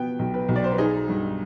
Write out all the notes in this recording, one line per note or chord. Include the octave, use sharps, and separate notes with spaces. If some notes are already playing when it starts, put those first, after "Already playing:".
Already playing: B2 B3 G5
B1
B4
B1
D5
C5
B4
D#4 G#4
G2